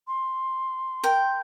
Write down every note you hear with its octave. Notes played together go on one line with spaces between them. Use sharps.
C6
A#4 G5